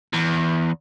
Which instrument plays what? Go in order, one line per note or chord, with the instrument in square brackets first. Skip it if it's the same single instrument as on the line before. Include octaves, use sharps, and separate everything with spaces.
[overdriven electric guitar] E2